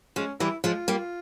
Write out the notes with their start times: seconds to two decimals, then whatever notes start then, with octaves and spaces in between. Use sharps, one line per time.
0.16 F3 G#3 C#4
0.40 E3 G3 E4
0.64 F3 G#3 F4
0.88 G3 A#3